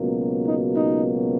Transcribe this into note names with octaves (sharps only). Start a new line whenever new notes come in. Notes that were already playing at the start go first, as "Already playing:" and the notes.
Already playing: C#2 B2 F#3 A#3
D#4
D#4